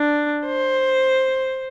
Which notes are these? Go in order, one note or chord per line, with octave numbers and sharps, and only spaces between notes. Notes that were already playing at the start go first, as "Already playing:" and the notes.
Already playing: D4
C5